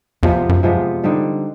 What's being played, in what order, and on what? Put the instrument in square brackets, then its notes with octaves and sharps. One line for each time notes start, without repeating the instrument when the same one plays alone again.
[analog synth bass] E2 [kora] C3 F3 G#3 B3
[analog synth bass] F#2
[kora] C3 F3 G#3 B3
D3 G3 C4 D#4